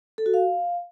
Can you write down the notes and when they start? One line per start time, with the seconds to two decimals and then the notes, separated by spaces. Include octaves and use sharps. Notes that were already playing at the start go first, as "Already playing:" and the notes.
0.18 A4
0.26 F#4
0.34 F5